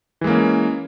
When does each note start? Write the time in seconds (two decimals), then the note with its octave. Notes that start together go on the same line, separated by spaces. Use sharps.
0.21 E3
0.24 G#3
0.27 A#3
0.30 C#4